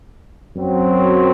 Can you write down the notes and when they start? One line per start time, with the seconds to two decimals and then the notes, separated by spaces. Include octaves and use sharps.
0.56 F#2 F#3 C4